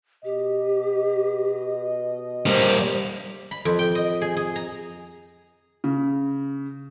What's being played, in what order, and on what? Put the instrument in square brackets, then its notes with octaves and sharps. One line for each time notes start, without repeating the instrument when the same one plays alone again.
[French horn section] B2 D#5 [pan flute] G4
[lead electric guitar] G3 A#3 [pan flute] C5
[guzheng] B5
F2
G5
D#5
G#4
G#4
A#5
[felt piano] C#3